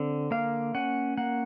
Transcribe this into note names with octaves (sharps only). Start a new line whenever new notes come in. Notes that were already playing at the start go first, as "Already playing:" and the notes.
Already playing: D3 C4
A#3 F5
C#4 F#5
A#3 F#5